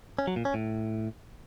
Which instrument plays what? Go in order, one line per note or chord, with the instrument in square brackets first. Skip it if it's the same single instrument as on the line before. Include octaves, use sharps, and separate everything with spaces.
[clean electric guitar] C#4
F#3
A#2
C#4
A2